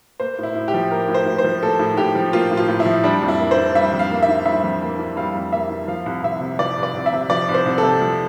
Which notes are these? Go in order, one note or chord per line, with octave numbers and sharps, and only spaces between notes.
A#3 C5
A2 E4
A2
G4
F3
A#3 A#4
A2
C5
A2
C5
F3
A#3 A4
A2
A2 G4
F3
A#3 F4
A2
F4
A2
E4
F3
G3 D4
F2
E4
A#3
C5
E3
G3 E5
F2
F5
A#3
E5
E3
G3 E5
F2
A#3
E3
G3 F5
F2
A#3 E5
E3
F3 F5
C2
C2 E5
C3
F3 D5
C2
D5
C2
E5
C3
F3 D5
C2
C5
C2
C3 A4
F3